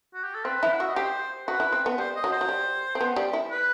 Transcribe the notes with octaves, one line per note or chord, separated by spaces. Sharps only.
F#4
G4
A4
C4 B4
E4
F#5
F#4 E5
D#5
G4 C5
F#4 B4
E4
C4
B3
G3 C5
D#5
F#3
C5
F#3
G3
C4
B3
G3
E4
B4